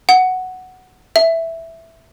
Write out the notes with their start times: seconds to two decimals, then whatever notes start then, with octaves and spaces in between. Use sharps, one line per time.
0.09 F#5
1.16 E5